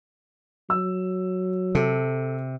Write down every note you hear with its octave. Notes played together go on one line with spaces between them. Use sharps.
F#3 E6
C3 A4